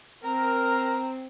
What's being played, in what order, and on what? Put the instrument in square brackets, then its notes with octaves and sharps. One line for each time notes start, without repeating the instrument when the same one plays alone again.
[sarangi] C4 [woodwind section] A#4 [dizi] A#5